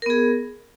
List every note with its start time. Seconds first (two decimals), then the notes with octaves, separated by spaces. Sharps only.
0.02 A#4
0.06 B3
0.10 G#4